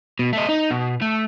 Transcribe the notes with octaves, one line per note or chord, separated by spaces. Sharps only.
B2
A3 D#5
D#4
B2
A3